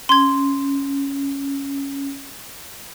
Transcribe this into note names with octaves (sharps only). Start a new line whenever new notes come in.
C#4 C6 G#6